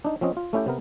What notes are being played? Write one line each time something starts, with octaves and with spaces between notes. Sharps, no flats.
D4 D#4
F3 C4 C#4 D#5
F4
A3 C#4 E4 G4 G5
C3 B3 A#4